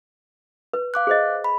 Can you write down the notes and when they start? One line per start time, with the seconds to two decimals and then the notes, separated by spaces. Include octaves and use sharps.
0.73 B4
0.94 F5 D6 F#6
1.07 G#4 C5 D#5
1.44 B5